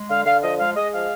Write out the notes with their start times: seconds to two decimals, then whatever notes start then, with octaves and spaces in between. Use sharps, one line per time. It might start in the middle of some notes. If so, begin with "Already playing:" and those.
Already playing: G#3
0.09 D3 F5
0.25 D3 F5
0.42 F3 D#5
0.59 G#3 F5
0.76 G#3 D#5
0.93 F3 F5